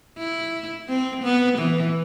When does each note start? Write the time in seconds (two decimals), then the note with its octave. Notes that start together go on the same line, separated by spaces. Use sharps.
0.18 E4
0.89 C4
1.24 B3
1.59 E3